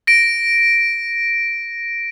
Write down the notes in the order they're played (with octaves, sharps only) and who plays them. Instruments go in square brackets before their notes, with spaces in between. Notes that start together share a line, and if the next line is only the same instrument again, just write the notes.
[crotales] A#6 D7